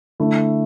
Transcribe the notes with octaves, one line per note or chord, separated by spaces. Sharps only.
D3 A3 E4